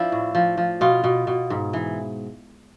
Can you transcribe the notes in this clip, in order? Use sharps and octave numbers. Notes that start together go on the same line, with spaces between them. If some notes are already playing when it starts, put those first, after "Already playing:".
Already playing: F3 D4 E4
A2
F3
F3
B2 F4
B2
B2
G#2
E3